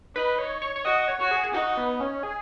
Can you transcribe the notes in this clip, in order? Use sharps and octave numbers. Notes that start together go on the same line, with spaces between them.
D#4 B4
C#5
C#5
C#5
F#4 D#5
C#5
F#4
G#4
D#4 F#4
B3
C#4
G#4